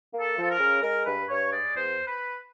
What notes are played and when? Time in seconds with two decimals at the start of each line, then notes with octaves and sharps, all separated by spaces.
0.13 A#3
0.20 A4
0.36 F3
0.42 A4
0.50 A#4
0.58 C#3
0.82 G#3 A#4
1.05 G2 B4
1.28 G2 C#5
1.52 G#3 D5
1.75 E2 C5
2.06 B4